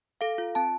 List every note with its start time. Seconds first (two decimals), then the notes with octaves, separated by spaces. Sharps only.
0.21 A4 F5
0.38 F4
0.55 C4 A5